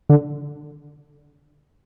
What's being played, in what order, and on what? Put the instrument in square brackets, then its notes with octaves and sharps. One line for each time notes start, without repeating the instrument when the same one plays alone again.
[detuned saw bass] D3